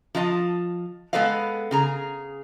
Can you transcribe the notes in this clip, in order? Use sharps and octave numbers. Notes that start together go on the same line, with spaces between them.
F3 F4 D#5 A5
G#3 B3 A4 B4 D#5 F5
C#3 G#4 A#5